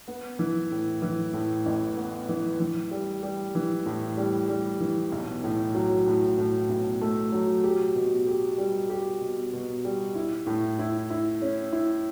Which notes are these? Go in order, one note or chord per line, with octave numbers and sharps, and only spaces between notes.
B3
E3
A2
E3
A2
A1
B3
E3
E3
G3
G3
E3
A2
G3
G3
E3
B1
A2
F#3
A2
A2
B1
A3
F#3
G4
B2
G4
G3
G4
B2
B2
G3
E4
A2
E4
E4
C#4
E4